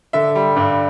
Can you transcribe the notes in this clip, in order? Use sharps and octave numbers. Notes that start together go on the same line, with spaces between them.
D3 E5
G3
G2